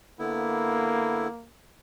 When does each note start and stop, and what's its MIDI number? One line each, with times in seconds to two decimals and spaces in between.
0.19 1.28 50
0.19 1.49 58
0.19 1.28 59
0.19 1.28 64